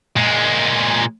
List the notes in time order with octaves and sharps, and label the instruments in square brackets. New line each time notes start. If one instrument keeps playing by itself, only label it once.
[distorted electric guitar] A#2 G#3